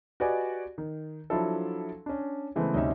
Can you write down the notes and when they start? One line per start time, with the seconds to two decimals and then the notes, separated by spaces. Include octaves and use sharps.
0.20 F#4 G4 B4 D5 D#5 G#5
0.78 D#3
1.30 F3 F#3 D4 E4 F4 A4
2.06 C#4 D4
2.56 C#3 E3 G#3 A3 B3 C4
2.74 D2 G2 C3 C#4 D#4 E5